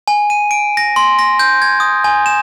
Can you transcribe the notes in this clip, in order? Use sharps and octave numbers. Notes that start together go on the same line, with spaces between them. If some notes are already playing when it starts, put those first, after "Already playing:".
G#5
D#7
D7
A#6
C6
A#6
G6
G#6
D#6
G#5
E7